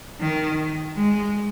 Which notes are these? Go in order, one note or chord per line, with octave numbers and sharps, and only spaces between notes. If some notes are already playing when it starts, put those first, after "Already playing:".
D#3
G#3